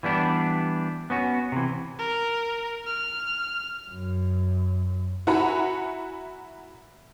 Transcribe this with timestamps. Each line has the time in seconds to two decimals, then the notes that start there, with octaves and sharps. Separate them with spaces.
0.03 E3 G3 B3 D4
1.10 B3 C#4 F#4
1.52 C3 E3
1.98 A#4
2.86 F6
3.91 F#2
5.27 E4 F#4 F#5 G#5 A#5 B5